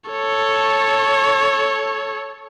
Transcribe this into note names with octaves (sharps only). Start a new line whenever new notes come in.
A4 C#5